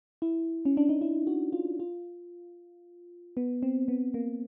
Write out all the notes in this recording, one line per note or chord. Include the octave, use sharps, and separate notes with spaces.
E4
C#4
D4
D#4
E4
F#4
F4
F4
B3
C4
B3
A#3